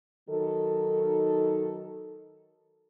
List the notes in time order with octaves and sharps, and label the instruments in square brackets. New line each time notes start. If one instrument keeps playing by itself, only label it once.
[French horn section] D#3 F#3 D#4 A4